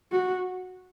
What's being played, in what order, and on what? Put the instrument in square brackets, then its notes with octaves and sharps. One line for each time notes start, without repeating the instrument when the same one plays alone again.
[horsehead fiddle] F#4